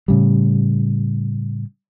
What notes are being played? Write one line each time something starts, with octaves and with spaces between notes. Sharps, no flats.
A2 C#3 G3